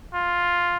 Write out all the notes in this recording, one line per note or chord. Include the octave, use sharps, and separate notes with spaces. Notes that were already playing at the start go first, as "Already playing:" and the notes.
F4